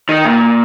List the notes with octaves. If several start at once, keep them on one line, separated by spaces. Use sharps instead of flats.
D#3
A#2